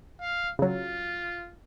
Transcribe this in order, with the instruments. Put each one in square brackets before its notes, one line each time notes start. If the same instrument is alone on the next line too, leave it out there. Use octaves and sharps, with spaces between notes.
[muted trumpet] F5
[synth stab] C#3 F#3 [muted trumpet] F4